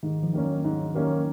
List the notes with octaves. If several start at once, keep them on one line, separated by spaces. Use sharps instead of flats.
G#2 D#3
F3
D#3 A#3 C#4
F#3
G#2
D#3 A#3 C#4